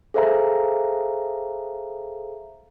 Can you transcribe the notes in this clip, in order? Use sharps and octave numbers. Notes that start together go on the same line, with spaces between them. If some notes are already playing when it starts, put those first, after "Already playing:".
G#4 A4 C5 E5 F5 A#5